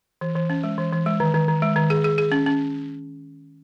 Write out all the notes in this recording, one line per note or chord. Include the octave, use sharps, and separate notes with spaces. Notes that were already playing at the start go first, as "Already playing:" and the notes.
E3
E3
C#4
G#3
E3
E3
G#3
D#3
D#3
D#3
G#3
D#3
G#4
G#4
G#4
C#4
C#4